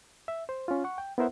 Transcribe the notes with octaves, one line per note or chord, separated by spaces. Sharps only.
E5
C5
C#4 F4
F#5 C#6
G5
B3 E4 A#4 C5 E5 F#5